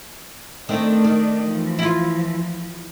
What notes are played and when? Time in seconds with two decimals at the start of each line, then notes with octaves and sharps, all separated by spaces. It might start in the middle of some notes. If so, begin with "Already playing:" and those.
0.69 D#3 A3 C4 D4
1.04 D#3
1.44 E3 F3
1.79 E4 F4